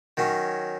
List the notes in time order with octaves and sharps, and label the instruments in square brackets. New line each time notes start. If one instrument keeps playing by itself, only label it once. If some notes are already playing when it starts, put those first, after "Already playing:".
[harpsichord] D#3 F#3 C#4